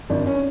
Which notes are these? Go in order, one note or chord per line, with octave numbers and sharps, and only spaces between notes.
G#1 D4
C#4